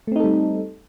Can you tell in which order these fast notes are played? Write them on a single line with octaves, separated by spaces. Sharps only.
A3 C4 D#4 A4 G3